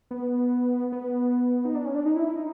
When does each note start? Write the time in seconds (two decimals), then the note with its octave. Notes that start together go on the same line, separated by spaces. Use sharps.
0.11 B3
0.92 B3
1.65 D#4
1.75 D4
1.85 C#4
1.95 D4
2.06 D#4
2.16 E4
2.35 D#4